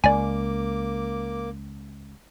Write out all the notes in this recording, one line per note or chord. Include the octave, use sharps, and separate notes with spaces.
C#2 A#3 D5 G#5 D6